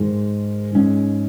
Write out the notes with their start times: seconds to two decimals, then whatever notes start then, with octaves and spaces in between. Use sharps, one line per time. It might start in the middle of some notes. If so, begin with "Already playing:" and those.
Already playing: G#2 D#3 G#3
0.75 G#2 G#3 C#4